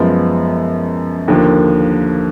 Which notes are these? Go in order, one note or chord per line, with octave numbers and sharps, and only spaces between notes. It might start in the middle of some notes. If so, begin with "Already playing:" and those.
Already playing: F#2 F3 G#3 B3
D#2 D3 F3 A#3